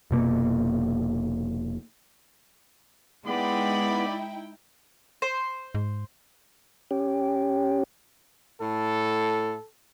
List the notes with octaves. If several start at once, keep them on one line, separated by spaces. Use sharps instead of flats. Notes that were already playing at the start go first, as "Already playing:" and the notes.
F1 B2 A#3
G#3 B3 D#4 E4 D5 G5 B5
C5
G#2
C#4 G4
A2 A4